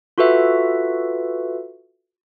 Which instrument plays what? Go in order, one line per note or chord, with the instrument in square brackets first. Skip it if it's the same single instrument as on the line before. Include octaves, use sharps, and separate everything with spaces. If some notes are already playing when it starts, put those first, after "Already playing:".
[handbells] F4 F#4 A4 B4 E5